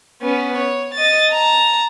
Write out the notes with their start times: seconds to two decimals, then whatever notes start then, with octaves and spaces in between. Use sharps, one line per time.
0.22 B3 C#4
0.58 C#5
0.95 D#5 A6
1.32 A5 A#5